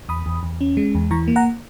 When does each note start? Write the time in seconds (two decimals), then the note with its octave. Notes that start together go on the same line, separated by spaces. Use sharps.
0.09 E2 B5 D#6
0.26 E2
0.43 E2
0.61 C#4
0.77 G#3
0.95 E2
1.11 E3 A#5 C#6
1.28 A#3
1.36 F#5 A#5